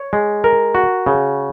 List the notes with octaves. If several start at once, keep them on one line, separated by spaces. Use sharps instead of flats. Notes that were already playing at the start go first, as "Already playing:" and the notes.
Already playing: C#5
G#3
A#4
F#4
C#3